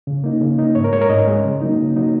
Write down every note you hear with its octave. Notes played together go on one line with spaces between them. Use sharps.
C#3
A#3 D#4
C#3
A#3 D#4
G#2 C#5
A#4
G#3 C#4 A#4 C#5
G#2 D#5
G#3 C#4
C#3
F#3 A#3 D#4
C#3
F#3 A#3 D#4